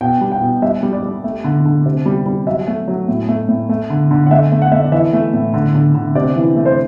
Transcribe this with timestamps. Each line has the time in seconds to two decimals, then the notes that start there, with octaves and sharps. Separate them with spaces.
0.01 B2 G5
0.21 G3
0.32 G5
0.42 B2
0.62 G3 E5
0.83 G3
0.93 D5
1.03 G3
1.24 A3
1.44 D3
1.65 D3
1.86 C3
2.06 G3
2.26 G3
2.47 F#3 E5
2.67 A3
2.88 F#3
3.08 A2
3.29 A3
3.48 A2
3.69 A3
3.90 D3
4.11 D3
4.26 F#5
4.31 A3 E5
4.52 A3
4.62 F#5
4.72 A3 E5
4.82 D5
4.92 E3 E5
5.13 A3
5.33 A2
5.54 D3
5.75 D3
5.95 D3
6.15 C3 D5
6.36 E3
6.56 A3
6.66 C5